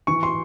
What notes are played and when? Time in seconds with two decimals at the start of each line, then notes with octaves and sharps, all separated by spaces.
0.07 E3 C#6
0.23 C6